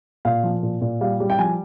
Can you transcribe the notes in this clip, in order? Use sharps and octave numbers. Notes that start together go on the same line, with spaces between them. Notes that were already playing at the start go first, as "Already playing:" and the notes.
A#2 F5
F3
A#2
A#2
G3 F5
G3
G5
F3 G#5